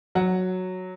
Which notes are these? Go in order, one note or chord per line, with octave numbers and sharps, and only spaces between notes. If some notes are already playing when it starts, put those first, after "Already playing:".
F#3 F#5